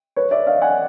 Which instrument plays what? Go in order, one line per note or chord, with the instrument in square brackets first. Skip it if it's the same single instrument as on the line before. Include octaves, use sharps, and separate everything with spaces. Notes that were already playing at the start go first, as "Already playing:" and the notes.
[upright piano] B4 C#5
D5 E5
D#5 F5
F#5 G#5